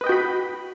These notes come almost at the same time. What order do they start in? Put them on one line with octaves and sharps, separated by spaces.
B4 D#5 G5 F#4 B5